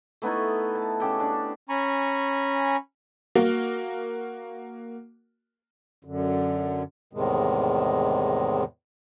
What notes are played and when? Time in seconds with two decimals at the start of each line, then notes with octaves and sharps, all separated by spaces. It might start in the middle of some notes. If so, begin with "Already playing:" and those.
0.22 A3 B3 D#4 E4
0.75 A5
1.00 C#3 G4 A4
1.20 D4
1.69 C#4 G#5 A#5 B5 C#6
3.35 A#3 F#4 A#4
6.04 F#2 D3
7.13 E2 A2 C3 D#3 G#3